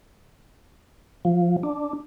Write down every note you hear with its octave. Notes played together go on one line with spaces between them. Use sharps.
F3
D4